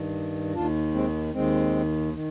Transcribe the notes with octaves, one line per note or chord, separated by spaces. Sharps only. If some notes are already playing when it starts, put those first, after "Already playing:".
Already playing: G2 D#3
D#2 D#3 D4 F4
G#3 C4
D#2 D#3 G#3 C4
D#3